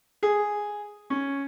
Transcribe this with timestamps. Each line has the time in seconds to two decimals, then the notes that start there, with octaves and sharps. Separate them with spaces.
0.23 G#4
1.10 C#4